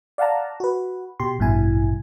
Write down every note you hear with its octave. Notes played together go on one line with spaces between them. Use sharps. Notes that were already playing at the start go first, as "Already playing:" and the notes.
D5 F5 F#5 A5 A#5
F#4 B4
B2 G4 C6
A1 G2 B2 E4 G#5